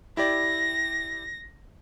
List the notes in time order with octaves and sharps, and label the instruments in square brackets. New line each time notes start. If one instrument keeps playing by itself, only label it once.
[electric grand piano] E4 G4 D5 [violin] A#6